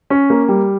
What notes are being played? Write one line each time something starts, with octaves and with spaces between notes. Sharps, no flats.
C#4
A#3
G3